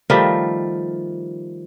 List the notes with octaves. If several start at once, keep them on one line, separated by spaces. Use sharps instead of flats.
D#3 F3 G3 A3